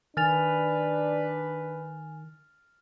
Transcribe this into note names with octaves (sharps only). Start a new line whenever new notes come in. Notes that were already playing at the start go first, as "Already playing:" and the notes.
D#3 D4 B4 G#5 F6 A6 F7